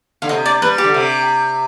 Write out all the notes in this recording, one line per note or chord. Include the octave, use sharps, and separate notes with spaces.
D3 F5
C3 D#5
D5
G3 B4
G4
D3
C3